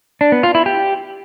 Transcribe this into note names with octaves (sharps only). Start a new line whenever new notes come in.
D4
B3
F4
E4
G4